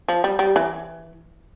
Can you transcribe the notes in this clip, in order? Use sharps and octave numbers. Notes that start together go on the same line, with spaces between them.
F3
G3
G3
E3